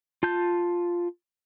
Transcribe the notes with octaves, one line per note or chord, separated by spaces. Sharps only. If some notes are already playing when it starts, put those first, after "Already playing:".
F4 A5 G6